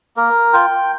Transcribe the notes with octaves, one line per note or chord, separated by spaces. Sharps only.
A#3 A#4
F4 G5